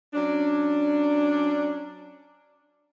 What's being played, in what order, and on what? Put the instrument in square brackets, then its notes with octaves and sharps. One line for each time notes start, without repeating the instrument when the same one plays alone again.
[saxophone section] F#3 C#4 D4